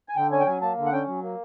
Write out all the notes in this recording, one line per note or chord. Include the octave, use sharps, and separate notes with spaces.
G#5
D3 G5
C#4 G#5
G5
F#3 G#5
A#3 A5
D3
F#5
C#4 G5
F#3
A#3